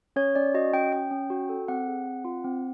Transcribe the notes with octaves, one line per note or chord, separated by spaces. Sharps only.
C#4 C#5
C#4 D5
F#4 D#5
C#4 G5
C#4 G5
C#4
F#4
A4
C4 F#5
G#4
C4
F4
C4